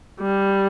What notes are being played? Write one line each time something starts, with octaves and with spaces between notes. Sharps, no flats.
G3